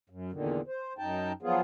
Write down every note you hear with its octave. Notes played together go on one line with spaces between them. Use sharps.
F#2
E2 A#2 D3 D#3
C5
F#2 D#4 G5 A5
F3 F#3 B3 F4 G#4